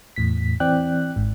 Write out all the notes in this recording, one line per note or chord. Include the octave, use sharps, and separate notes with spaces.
E2 A2 B6
E3 C4 D5 G5 F#6
G#1 G#2